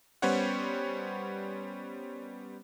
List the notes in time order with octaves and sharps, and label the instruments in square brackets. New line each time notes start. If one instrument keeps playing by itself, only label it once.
[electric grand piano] G3 B3 C#4 C5 C#5 F#5